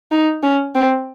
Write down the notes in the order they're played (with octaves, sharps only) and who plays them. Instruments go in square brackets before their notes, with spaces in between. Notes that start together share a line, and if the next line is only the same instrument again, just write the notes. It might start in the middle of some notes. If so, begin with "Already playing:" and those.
[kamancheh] D#4
C#4
C4